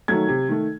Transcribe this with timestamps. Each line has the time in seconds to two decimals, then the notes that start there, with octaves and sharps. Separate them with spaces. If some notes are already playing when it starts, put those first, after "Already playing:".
0.08 D#3 F#3 A3 G#6
0.28 C3
0.49 D#3 A3